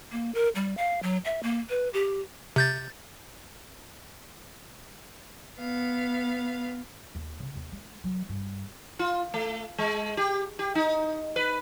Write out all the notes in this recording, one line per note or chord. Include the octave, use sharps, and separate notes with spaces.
A#3
A#4
G3
F5
F#3
E5
A#3
B4
G4
C3 G6 A6
B3 F5
D#2
C#3
D#2
G#3
F#3
G2
F4
A3
G#3
G4
G4
D#4
B4